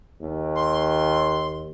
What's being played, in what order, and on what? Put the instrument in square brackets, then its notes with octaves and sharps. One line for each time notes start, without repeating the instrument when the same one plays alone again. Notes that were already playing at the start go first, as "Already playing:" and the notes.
[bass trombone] D#2
[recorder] C6